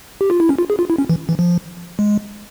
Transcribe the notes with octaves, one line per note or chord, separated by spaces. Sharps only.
G4
F4
E4
C#4
F4
G#4
F4
E4
C#4
E3
E3
F3
G#3